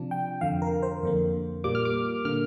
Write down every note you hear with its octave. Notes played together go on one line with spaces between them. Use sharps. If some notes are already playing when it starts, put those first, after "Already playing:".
Already playing: C3 F3 D4
G5
F2 D3 F3 F5
A#4
C5
F2 D3 A#3
A#2 G3 A#3 D6
F6
D6
D3 A#3 F6